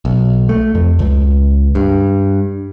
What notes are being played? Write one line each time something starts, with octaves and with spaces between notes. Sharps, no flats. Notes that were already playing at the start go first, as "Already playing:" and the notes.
B1
A3
F2
C#2
G2